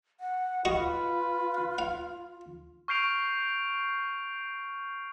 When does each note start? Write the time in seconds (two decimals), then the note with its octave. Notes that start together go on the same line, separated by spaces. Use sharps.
0.20 F#5
0.65 F4 F#4 B4 D#5 C#6
1.78 F5
2.88 C#6 F6 G6 C7 D7 F7